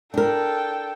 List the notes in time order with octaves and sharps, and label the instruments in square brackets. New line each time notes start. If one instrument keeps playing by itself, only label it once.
[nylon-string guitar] D4 A#4 [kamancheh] A4 G5